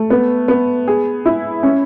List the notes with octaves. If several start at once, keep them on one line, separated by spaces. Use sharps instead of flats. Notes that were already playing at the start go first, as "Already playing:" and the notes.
Already playing: A3
B3
B3
G#4
E4
C#4